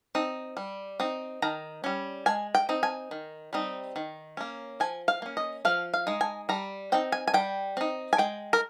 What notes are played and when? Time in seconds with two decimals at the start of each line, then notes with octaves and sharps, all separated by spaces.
0.15 C4 D#4
0.57 G3
1.00 C4 D#4
1.42 D#3 A#5
1.84 G3 C#4
2.26 G#3 G#5
2.55 G5
2.69 C4 D#4
2.83 G#5
3.11 D#3
3.53 G3 C4 D#4
3.96 D#3
4.37 A#3 C#4
4.80 F3 G#5
5.08 F5
5.22 A#3 C#4
5.37 D#5
5.65 F3 F5
5.94 F5
6.07 G#3 D#4
6.21 G#5
6.49 G3 A#5
6.92 C4 D#4 G5
7.12 G#5
7.27 G#5
7.34 G3 G5
7.77 C4 D#4
8.13 G#5
8.18 G#3 G5
8.53 A#4